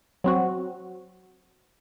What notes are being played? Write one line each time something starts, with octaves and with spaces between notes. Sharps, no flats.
F#3 C4 F#4